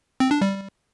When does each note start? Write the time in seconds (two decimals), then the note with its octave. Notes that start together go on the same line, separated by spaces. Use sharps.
0.20 C4
0.31 D4
0.41 G3